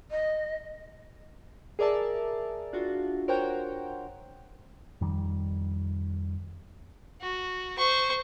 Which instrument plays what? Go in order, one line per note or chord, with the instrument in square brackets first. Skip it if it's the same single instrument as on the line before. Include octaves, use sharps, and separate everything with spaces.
[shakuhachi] D#5
[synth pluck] G#4 A#4 D5 E5 A5
D4 F4 F#4
A#4 C5 C#5 F#5 G5
[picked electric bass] F2 D#3 G3
[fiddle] F#4
C5 C#6